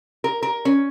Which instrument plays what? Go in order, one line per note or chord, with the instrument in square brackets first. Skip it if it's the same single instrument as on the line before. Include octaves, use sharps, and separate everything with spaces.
[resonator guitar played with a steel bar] A#4
A#4
C#4